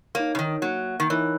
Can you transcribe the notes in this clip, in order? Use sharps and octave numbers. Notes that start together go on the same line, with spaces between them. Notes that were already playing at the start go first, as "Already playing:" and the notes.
A#3 D#4 A#4 C#5
C#3
D#3
F#3 A#3
D#3
E3 D#4 A#4 C#5